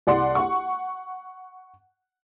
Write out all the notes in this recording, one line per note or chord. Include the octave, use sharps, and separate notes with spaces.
C2 D5 F#5 C6
F#5 C#6